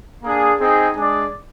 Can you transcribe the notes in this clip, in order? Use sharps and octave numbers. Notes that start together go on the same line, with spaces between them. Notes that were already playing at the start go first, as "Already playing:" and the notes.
A#3 D4 G#4
C4 D#4 G#4
G#3 D4 G#4 D5